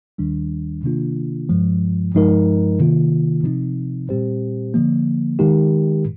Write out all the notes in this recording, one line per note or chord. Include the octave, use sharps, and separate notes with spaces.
D#2 D#3 G3 D4
C3 D#3 A#3 D4 F4
G2 F3 G#3
G2 F3 G#3 D#4 A#4
C3 D#3 A#3 F4
C3 F3 C4 D#4
A#2 G3 C4 G4 C5
D3 F3 A#3
D#3 G#3 D#4 G4 A#4